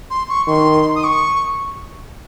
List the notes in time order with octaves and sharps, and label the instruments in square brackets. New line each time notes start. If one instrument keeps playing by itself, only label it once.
[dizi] C6
C#6
[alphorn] D#3 [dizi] C6
[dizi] D#6
C#6